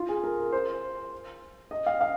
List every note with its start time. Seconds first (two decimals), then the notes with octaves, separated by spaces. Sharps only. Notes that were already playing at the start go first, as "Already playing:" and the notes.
Already playing: F4
0.09 G#4
0.24 A#4
0.52 C5
1.71 D#5
1.86 F5
2.01 F5